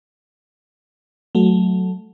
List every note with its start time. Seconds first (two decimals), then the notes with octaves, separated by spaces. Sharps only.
1.35 F#3 A3